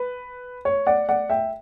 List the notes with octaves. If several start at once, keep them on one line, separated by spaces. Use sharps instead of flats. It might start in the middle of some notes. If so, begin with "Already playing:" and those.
Already playing: B4
C#5
D5 F#5
D5 F#5
E5 G5